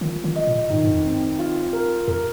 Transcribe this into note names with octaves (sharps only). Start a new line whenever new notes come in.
D#3 F4
D#3
D#5
A#2
G2 D#3
G2
F2
C4
F4
A#4
F2 A#4